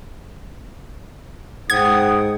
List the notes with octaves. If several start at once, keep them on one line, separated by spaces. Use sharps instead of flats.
G#2 F#5 G5 D#6 G#6